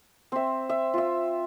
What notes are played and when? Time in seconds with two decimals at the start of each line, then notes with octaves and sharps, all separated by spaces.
0.32 C4 E5
0.69 E5
0.94 F4 E5